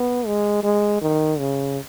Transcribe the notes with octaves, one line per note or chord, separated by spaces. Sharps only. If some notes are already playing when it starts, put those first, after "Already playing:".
Already playing: B3
G#3
G#3
D#3
C#3